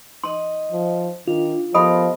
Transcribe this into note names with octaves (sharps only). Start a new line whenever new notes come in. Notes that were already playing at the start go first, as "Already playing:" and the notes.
D#4 D#5 C6
F3
D#3 D4 F4
F3 B3 G4 A4 A#4 D#5 B5 D#6